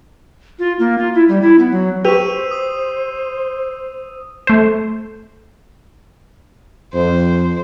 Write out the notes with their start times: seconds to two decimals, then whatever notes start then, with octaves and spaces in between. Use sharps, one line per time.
0.59 F4
0.79 A#3
0.98 F4
1.14 E4
1.28 G3
1.42 E4
1.59 B3
1.71 F#3
2.05 G4 B4 C5 C#6 E6 D#7 F7
2.51 D#6
4.47 A3 C5
6.94 F2 C5